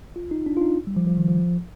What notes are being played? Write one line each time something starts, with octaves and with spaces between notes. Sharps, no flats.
F4
D#4
D4
F4
D#4
G3
F3
F3
D#3
F3